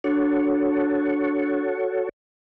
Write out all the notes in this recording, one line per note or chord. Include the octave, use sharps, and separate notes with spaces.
D4 F#4 A4 C#5